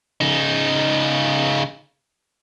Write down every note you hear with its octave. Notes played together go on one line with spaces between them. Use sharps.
C#3 D#4